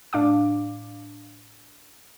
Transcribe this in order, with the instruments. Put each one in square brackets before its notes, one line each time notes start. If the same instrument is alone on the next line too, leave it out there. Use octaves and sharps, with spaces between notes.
[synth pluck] A2 D4 F5 D6